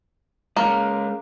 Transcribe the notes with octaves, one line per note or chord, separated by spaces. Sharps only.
G#3 A#3 C#4